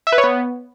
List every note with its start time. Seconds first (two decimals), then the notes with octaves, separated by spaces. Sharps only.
0.07 E5
0.12 B4
0.18 C#5
0.24 B3